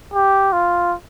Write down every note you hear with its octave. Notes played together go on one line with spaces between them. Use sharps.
G4
F4